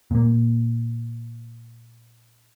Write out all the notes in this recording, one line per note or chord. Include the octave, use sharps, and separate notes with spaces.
A#2 A#3